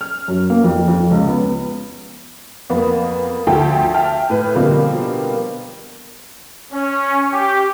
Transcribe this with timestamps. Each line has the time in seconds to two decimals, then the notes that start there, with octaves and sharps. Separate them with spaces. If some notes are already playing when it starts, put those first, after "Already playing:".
0.01 F6
0.28 F#2
0.50 A#3
0.64 F2
0.88 F2
1.11 C#2
1.27 B3
2.70 F2 A#3 B3
3.47 D2 F3 A3 G5 A5
3.94 E5 G5 A5 F6
4.30 A2 B4
4.55 B2 D3 F3 G3 A#3 C4
6.73 C#4
7.33 G4